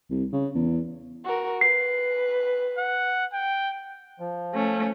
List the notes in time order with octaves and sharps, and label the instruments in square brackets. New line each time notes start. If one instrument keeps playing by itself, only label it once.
[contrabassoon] C2
C#3
E2
[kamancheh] F#4 A#4
[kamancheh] B4 [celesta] C7
[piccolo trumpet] F#5
G5
[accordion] F3
[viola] A3 C#4